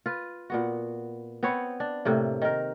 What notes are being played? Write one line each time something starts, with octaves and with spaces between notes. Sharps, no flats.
F4 B4
A#2 B3 F#4
B3 C4 B4 C#5
D4
A2 C3 A#3
D#3 A#4